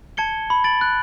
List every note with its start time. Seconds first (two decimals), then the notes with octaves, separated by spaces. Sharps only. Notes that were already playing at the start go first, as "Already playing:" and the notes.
0.17 A5 G#6 C#7 G7
0.50 B5
0.64 A6 D7 F#7
0.81 F#6